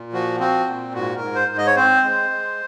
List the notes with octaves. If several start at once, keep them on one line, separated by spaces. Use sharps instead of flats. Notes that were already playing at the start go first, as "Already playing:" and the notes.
Already playing: A#2
F3 F#4
C4 F#4
A#2
G#2 F#4
A#4
G#2
C5
G#2
D#5
C#5
C4 C5
G#3
G#3